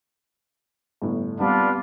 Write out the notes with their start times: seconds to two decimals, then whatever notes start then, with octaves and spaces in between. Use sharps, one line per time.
1.02 G1 A2
1.40 G3 B3 C4 D4 F4 B4